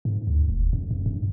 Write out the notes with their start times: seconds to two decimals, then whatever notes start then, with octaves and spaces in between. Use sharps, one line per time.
0.05 G#2
0.27 D2
0.49 E1
0.73 F#2
0.91 F#2
1.06 G2